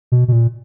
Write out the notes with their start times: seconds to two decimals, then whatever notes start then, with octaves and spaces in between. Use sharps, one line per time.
0.12 B2
0.28 B2
0.32 A#2